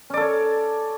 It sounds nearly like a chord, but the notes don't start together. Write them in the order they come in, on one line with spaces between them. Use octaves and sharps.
C#4 D5 A4 C#5